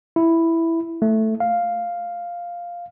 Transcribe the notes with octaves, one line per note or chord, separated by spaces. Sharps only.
E4
A3
F5